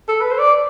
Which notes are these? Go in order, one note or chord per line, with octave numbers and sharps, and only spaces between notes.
A4
B4
C5
D5